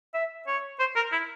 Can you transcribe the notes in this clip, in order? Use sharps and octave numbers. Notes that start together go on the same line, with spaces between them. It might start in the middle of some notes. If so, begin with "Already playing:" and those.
E5
C#5
C5
A#4
E4